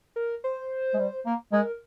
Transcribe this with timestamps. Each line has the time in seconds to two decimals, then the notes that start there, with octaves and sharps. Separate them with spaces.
0.16 A#4
0.44 C5
0.94 G#3
0.99 G3
1.26 A#3
1.52 G#3 A#4